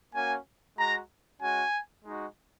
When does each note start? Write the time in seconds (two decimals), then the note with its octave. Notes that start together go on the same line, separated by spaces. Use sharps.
0.14 A#3 C#4 F#4 G#5
0.77 G#3 F#4 A#5
1.42 G#3 C#4 F#4 G#5
2.04 G#3 D#4 F#4